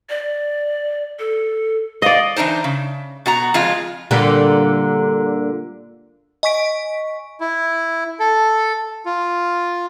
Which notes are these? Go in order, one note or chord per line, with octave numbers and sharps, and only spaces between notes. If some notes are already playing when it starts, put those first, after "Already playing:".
D5
A4
D5 D#5 F5
E3 G#3 D4 D#4 C5
C#3
B2 F#4 A#5
F2 G#3 F4
A#2 D3 G3
D#5 G#5 C#6 B6 D7
E4
A4
F4